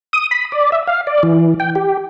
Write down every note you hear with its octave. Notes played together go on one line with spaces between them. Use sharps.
D#6
B5
D5
E5
F5
D5
E3
G5
G4